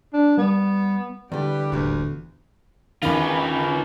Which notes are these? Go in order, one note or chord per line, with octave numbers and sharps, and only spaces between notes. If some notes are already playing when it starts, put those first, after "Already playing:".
D4
G3 B3
E2 D3 G3 G4 B4
D#1 A1 D2
E2 D#3 C#4 F4 B4